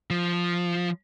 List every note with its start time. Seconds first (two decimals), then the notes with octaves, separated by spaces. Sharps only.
0.10 F3